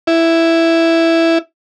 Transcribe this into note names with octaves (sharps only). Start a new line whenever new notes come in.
E4